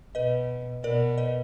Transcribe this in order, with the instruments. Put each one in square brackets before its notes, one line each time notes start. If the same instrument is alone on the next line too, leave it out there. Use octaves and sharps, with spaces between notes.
[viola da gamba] B2 [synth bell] B4 D#5
[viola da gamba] B2 [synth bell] A#4 D5
[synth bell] B4 D#5